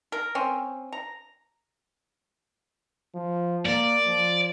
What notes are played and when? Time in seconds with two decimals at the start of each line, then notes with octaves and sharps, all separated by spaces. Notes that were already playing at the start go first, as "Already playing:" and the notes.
0.12 A#4
0.35 C4 C#4
0.93 A#5
3.15 F3
3.66 A#3 D5
4.06 F3